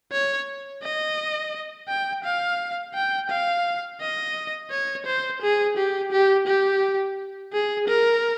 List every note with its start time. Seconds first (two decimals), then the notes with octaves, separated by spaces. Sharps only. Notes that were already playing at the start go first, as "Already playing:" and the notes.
0.12 C#5
0.83 D#5
1.89 G5
2.24 F5
2.95 G5
3.30 F5
4.01 D#5
4.71 C#5
5.06 C5
5.42 G#4
5.77 G4
6.12 G4
6.47 G4
7.53 G#4
7.88 A#4